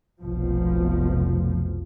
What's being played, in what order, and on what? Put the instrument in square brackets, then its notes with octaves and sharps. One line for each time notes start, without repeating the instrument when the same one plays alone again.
[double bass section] F1 B1 F3